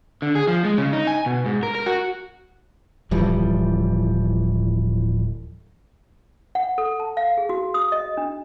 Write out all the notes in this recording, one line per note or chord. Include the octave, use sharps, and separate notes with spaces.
D3
G#4
F3
G#3
C#3
D#4
G#5
B2
G#2
A#4
A#4
F#4
D1 E3 F3 G3
F#5
A4
A5
F5
G#4
F#4
D#6
D#5
D4